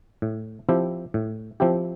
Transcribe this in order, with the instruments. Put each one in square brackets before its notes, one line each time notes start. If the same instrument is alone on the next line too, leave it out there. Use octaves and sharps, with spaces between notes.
[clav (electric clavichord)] A2
F3 C4 E4 G4
A2
F3 C4 E4 G4